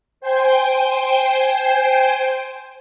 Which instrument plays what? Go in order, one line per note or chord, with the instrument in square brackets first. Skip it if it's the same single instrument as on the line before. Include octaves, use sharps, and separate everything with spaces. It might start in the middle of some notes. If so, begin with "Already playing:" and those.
[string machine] C5 G5 G#5